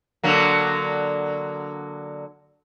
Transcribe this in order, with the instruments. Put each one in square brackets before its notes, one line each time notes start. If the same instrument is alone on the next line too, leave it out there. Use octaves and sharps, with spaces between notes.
[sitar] D3 F#3 A#3